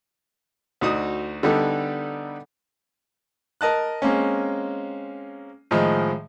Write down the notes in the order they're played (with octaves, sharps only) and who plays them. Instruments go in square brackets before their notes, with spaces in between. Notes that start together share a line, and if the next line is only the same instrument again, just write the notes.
[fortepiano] D2 D#4 F#4 D#6
D3 G3 B3 D#4 A4
[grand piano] A#4 D#5 A5 F#6
G#3 A#3 C4 C#4
A2 D#3 F3 G#3